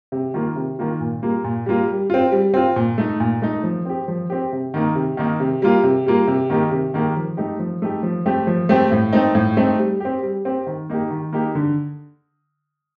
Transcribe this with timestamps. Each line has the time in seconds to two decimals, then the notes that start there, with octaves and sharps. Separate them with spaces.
0.12 C3
0.34 D#3 A#3 F4
0.56 C3
0.79 D#3 A#3 F4
1.00 A#2
1.23 G3 A#3 F4
1.44 A#2
1.66 G3 A#3 F4
1.88 G3
2.10 C4 F4
2.32 G3
2.54 C4 F4
2.76 A#2
2.98 A3 D#4
3.20 A#2
3.42 A3 D#4
3.63 F3
3.85 C4 G4
4.08 F3
4.30 C4 G4
4.52 C3
4.74 D#3 A#3 D#4
4.95 C3
5.17 D#3 A#3 D#4
5.40 C3
5.62 G3 A#3 F4
5.83 C3
6.06 G3 A#3 F4
6.28 C3
6.50 D#3 A#3 D#4 G4
6.71 C3
6.94 D#3 A#3 D#4 G4
7.16 F3
7.37 A3 D#4 G4
7.59 F3
7.82 A3 D#4 G4
8.03 F3
8.26 A3 C4 G4
8.47 F3
8.69 A3 C4 G4
8.92 A2
9.13 A3 C4 D#4
9.35 A2
9.57 A3 C4 D#4
9.79 G3
10.00 C4 G4
10.22 G3
10.45 C4 G4
10.67 D#3
10.90 A#3 D#4 G4
11.11 D#3
11.33 A#3 D#4 G4
11.55 D3